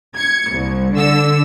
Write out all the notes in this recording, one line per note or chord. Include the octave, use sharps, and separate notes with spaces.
G#6 C#7
C2
D3 E6